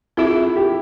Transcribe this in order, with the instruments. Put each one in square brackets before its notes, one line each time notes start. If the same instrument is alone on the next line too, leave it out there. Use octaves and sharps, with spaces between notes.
[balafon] C4 F4 G#4 [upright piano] E4
[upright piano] E4
G4